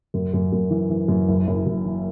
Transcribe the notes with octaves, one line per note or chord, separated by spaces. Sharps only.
F#2
F#2
F#2
E3
E3
F#2
F#1
F#1
F#2
E3